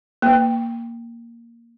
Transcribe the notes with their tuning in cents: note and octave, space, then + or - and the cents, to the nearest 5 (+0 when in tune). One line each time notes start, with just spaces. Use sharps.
A#3 +0 G5 +10